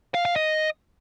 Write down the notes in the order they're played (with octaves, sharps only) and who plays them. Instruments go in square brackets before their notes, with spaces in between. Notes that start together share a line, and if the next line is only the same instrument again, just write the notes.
[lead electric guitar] F5
F5
D#5